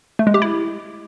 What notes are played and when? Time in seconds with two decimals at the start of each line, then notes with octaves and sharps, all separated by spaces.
0.19 A3
0.27 G#3
0.34 G4
0.42 E4